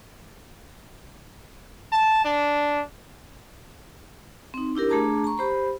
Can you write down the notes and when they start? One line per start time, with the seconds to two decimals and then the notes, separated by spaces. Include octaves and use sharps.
1.92 A5
2.25 D4
4.54 C4 D#4
4.75 D4 E4 G4 A#4
4.89 A3 D4 G#4 A5 A#5 D6
5.24 A#5 C#6
5.38 G4 C5 B5